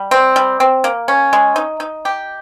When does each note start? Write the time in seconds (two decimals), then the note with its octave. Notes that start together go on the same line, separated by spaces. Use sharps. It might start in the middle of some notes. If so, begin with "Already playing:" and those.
Already playing: G3
0.11 C4
0.36 G3
0.60 C4
0.84 A#3
1.08 C#4
1.33 G#3
1.56 D#4
1.80 D#4
2.05 G4